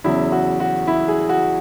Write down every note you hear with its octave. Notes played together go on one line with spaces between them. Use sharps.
E2 C#3 F#3 E4
F#4
F#4
E4
G#4
F#4